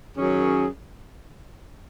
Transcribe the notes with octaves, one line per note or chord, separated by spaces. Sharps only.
F#2 D#3 F#3 C#4 G#4